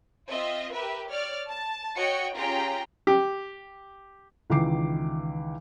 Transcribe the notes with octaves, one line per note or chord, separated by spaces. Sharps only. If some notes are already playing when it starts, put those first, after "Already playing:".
C4 F4 D#5 E5
G4 A#4 B4 E5
C#5 D5 F6
A5
F#4 C#5 D#5 G5 C#7
C#4 F4 G4 G#4 G5 A#5
G4
C#2 D#3 E3 D6 C7